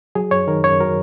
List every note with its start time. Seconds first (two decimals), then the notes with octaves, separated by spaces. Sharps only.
0.15 F#3 G#4
0.31 F#2 C#5
0.47 D#3 A#4
0.64 F#2 C#5
0.80 F#3 A#4